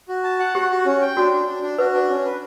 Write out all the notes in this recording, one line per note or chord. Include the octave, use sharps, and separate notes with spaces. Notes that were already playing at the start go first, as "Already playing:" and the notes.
F#4
A5
F#5
F#4 G4
F#4
C#4
G5
D4 F#4
D4
D4
D4
F#4 B4
D4
C#4
B4